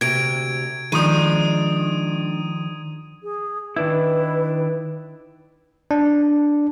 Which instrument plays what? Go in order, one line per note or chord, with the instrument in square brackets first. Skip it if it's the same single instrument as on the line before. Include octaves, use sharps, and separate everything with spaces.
[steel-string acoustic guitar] D2 C3 [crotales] G#6 D7
[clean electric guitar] D#3 F3 [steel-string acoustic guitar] G#3 D4 [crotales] D#6 D#7
[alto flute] G#4
[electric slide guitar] D#3 D4 E4 [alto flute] B4
[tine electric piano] D4